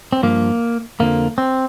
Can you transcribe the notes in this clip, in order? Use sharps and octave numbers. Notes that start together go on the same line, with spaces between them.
C4
G2 F3 A#3
F2 D3 F3 A#3
C4